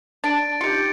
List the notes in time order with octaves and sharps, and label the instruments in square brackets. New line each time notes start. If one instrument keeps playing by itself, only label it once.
[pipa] D4 [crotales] A6 D7
[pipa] D#4 F4 [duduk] G4 [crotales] C#7